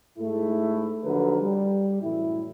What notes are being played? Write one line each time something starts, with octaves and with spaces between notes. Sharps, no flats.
G#2 A3 E4
D#2 D3 F3 F#3 A#4 B4
G3
F#2 A2 E3 E4